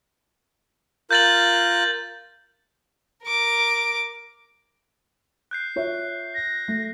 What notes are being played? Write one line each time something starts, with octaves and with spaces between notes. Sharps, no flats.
F4 A#4 F#6 G6 A6 F#7
A#4 D6
F#6 G6 C7
F4 C#5 E5
A#6
A3